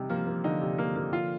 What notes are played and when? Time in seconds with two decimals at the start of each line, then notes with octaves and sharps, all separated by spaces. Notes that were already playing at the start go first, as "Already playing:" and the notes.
Already playing: C3 G3 D#4
0.09 F3 A#3
0.27 A#3
0.44 D3 D#4
0.61 C3
0.78 A#3
0.96 A#3
1.13 F4